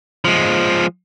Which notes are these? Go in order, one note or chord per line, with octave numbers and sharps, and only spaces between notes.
F3 G#3